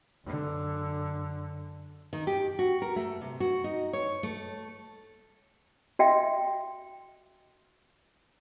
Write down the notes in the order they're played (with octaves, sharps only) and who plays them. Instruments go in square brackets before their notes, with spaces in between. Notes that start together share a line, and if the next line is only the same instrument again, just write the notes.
[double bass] F#2 D3
[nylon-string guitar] D#3
G4
F#4
A#4
A3
C3
F#4
D#4
C#5
A3
[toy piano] F#4 D#5 E5 G5